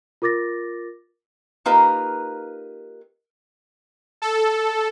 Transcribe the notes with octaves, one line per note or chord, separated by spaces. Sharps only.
F4 A#4 D6 A6 A#6
A#3 D#4 F4 G4 A#4 B4
A4